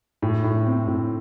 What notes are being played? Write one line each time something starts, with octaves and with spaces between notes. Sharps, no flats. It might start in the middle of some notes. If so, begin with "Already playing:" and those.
A2
A2
C4
A2